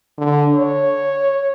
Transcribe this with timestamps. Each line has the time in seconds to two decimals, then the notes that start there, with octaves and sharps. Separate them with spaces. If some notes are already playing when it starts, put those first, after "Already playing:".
0.18 D3
0.55 C#5